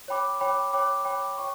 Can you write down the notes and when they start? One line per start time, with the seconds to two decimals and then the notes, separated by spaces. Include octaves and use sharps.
0.08 C#5 G5 B5 D6
0.40 C#5 G5 B5 D6
0.73 C#5 G5 B5 D6
1.05 C#5 G5 B5 D6
1.37 C#5 G5 C#6